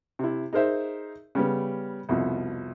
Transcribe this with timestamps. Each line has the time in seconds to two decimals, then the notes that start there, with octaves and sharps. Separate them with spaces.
0.19 C3 E4
0.53 D#4 G#4 A#4 C5 E5
1.35 C#3 G3 B3
2.09 C2 F2 B2